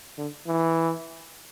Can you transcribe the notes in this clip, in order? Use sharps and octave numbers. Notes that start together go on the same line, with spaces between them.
D3
E3